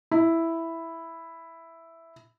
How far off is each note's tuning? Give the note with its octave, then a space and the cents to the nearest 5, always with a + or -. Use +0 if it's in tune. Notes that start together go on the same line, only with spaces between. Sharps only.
E4 +0